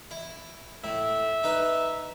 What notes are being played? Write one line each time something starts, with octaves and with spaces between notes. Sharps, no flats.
E4
A2 E5
D#4 B4